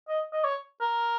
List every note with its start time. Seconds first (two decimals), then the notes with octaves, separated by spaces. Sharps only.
0.09 D#5
0.33 D#5
0.44 C#5
0.81 A#4